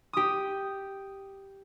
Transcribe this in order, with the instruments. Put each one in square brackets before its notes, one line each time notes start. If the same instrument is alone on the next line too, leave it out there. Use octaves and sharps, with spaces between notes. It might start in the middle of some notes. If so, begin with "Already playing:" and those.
[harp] G4 D#6